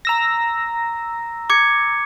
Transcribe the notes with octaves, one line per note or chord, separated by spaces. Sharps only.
A#5 E6 A#6
D6 G#6 C#7